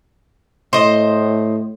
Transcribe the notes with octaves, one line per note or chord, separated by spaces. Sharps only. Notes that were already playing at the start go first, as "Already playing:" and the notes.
A2 C5 D#5